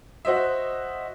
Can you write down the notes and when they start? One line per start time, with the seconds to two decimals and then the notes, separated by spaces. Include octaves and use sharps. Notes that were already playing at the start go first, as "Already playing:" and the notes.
0.25 F#4 C5 D#5 E5